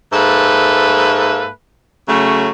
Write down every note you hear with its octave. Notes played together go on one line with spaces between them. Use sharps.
G#2 A#3 A4 B4 E5
C#3 F#3 A3